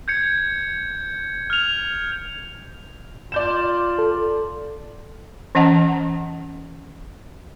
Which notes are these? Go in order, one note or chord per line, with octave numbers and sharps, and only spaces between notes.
G6 G#6 C#7
F6 F7
F4 D5 G6 E7
A4
E3 C#4 D#5 F#5 A5